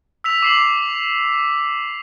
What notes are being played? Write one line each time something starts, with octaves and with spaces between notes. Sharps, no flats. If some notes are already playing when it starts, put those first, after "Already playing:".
E6 B6 F7
D6 C7 F#7